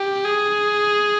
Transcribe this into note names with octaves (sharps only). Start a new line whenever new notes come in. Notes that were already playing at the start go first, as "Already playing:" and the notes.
Already playing: G4
G#4